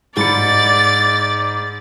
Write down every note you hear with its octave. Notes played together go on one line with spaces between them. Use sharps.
G#2 D5 B5 A6 C#7